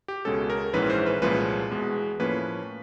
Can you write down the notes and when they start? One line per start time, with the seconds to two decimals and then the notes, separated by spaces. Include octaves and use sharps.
0.08 G4
0.25 C#2 B2 G#3 C#4 A4
0.50 A#4
0.73 A#1 G#2 E3 G#3 C#4 B4
0.90 C5
1.06 B4
1.22 C2 A#2 F3 G#3 C#4 B4
1.71 E2 B2 G#3
2.20 A2 F3 A#3 C#4 B4